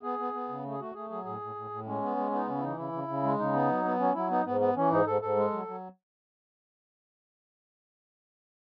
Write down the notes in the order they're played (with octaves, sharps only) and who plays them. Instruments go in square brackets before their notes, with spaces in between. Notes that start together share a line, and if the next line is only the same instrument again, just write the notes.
[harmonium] B3 G#4
B3
B3
C#3
A3
G#4
A3 F#4
A3 G#4
F#3 G#4
A2 G#4
A2
A2
A2
G#3 C#4
B3
G#3
B3 D#4
C#3 C#4
E4
E3 D#4
C#3 E4
C#3
C#3
G#3
C#3 D#4
B3
F#3
B3
F#3 C#4
F#3 E4
B3 D#4
G#2 B3
B3
E3 C#4
G#2 D#4
G#2 A4
G#2 A4
G#3
F#3
F#3